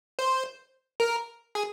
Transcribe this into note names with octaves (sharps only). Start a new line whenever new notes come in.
C5
A#4
G#4